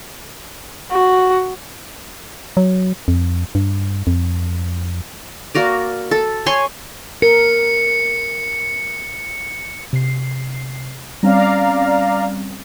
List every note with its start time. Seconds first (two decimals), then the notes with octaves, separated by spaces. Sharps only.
0.91 F#4
2.57 F#3
3.08 F2
3.55 G2
4.07 F2
5.55 A#3 F#4 A#4 D5
6.11 A4
6.46 C#5 G#5 C6 C#6
7.22 A#4 C#7
9.93 C3 C7
11.23 G3 C4 C#4 D5 F5 A#5